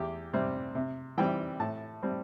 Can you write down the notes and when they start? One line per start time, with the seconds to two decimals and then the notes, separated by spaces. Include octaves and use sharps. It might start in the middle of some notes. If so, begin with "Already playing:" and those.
Already playing: E2 G4
0.33 C3 G3 C4
0.75 C3
1.18 E3 G3 C4 G5
1.60 A2 A5
2.02 G3 C4